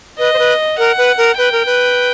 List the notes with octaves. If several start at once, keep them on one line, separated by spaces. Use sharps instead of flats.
B4 D#5
C5
B4
A#4 F#5
B4
A#4
B4 G5
A#4
B4